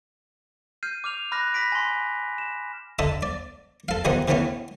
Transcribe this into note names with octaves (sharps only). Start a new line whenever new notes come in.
F6 G6 C7 D#7
D6 F6 F7
B5 D6 F6 F#6 A#6
B5 A#6 B6 D7
G#5 C6
E7
D3 A4 D#5 E5
D5
A4 F5
B1 D#3 F3 D#4 D#5 F#5
B2 D#3 E3 A3 B3 C#4